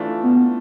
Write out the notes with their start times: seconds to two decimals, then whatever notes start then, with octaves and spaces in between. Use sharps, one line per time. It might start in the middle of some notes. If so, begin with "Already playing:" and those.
Already playing: E3 A3 D4 F4
0.23 B3